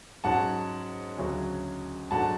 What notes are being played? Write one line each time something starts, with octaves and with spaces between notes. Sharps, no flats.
G#2 F#3 C#4 F#5 A5
D2 C#3 F#3 C#4
G#2 F#3 A3 D4 F#5 A5